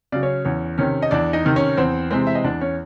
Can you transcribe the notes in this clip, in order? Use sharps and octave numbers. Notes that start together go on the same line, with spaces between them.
C#3 F#3 D5
C#4 C#5
E2 C#4 C#5
C3 D#3 C#4 C#5
D#5
E2 D4 D5
D#4 D#5
C3 D#3
C#4 C#5
E2 C4 C5
C3 E3 G#3 C4 C5
E5
D#5
E2 D4 D5
C#4 C#5